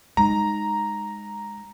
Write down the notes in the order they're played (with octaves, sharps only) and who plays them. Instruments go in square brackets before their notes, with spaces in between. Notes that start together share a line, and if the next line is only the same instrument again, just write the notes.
[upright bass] G#3 D#4 [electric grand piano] A#5